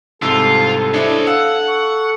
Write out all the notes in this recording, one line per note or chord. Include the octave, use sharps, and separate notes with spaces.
C2 G#2 F4 A4 A5 E6
D4 E4 C5 C#5 D#5
F5 F#5 E6
C#6